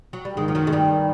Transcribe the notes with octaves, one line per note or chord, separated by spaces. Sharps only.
F#3
G3
G#2 D#3 G#3
F3
F#2 F#3
G#3
G2 G3